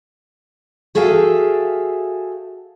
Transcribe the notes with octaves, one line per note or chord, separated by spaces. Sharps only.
F#4 G#4 A4 E5 F5 G5